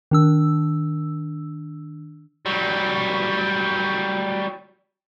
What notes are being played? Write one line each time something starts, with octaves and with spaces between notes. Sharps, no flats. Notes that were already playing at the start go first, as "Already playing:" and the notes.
D#3 D4 E6
F#3 G3